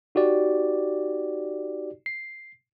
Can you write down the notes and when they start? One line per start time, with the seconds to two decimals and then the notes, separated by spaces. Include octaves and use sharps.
0.15 D#4 F#4 G4 D5
2.06 C7